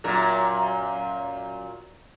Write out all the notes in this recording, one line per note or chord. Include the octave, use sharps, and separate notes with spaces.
F#2 A#2 A#4